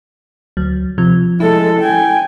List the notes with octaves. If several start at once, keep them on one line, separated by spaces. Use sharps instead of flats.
D2 F#3
C3 F3
G#3 E4 A4
G5 G#5